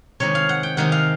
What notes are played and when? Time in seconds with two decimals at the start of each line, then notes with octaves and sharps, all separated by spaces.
0.20 C3 D#3 G#3 C#5
0.35 F5
0.49 F#5
0.63 G5
0.77 C3 D#3 G#3 F#5
0.92 F5